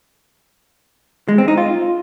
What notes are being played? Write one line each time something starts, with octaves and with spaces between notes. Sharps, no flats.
G#3
C4
D#4
F4